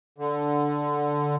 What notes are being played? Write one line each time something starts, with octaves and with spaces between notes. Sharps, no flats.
D3